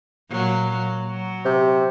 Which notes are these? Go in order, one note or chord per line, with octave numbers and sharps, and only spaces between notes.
A#2 F#3
F#3
C3